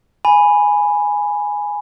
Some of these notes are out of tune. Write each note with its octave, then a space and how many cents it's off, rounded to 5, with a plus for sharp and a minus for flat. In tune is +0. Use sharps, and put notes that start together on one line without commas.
G#5 +0 B5 +0